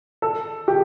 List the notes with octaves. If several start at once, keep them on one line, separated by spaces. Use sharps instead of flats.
A4
G4